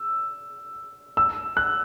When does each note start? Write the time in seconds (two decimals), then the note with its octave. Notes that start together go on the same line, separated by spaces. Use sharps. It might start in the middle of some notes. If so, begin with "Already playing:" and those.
Already playing: E6
1.17 E6
1.57 F#6